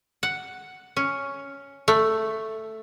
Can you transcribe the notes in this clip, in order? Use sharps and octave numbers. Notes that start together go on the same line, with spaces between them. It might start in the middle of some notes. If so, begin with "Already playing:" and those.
F#5
C#4
A3